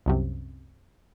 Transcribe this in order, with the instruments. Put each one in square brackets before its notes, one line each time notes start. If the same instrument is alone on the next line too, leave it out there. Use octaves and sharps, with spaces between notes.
[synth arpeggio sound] C2 F#2 C3